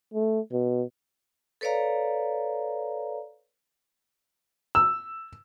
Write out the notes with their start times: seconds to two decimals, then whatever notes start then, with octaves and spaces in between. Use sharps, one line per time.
0.14 A3
0.52 B2
1.61 A4 B4 C#5 D5 F5 A#5
4.75 E6